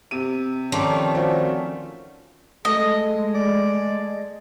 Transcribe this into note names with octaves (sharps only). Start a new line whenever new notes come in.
C3 D#7
D#3 F3 A3 C#4 D5
C4 F4 F#4
G#3 A3 A4 D#5
D5